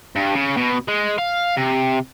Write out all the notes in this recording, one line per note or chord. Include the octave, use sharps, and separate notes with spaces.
G2
C#3
B2
G#3
F5
C3